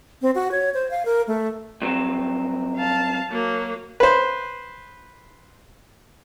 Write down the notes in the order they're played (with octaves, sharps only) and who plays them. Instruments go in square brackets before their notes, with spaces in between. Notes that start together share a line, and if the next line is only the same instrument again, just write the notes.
[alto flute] C4
F#4
C#5
C5
F5
A#4
A3
[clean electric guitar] G2 F#3 C4
[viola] F5 A5
F#3 A#3
[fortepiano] B4 C5